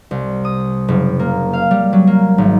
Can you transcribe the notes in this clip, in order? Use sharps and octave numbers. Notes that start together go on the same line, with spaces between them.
C2
D#6
F#1
A#3
F5
G3
F#3
A#3
G#1